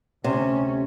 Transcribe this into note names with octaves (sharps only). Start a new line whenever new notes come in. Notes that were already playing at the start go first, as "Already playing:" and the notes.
D2 C3 C#4